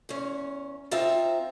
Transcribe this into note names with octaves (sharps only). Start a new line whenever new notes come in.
E2 C#4
C4 D#4 F4 C5 E5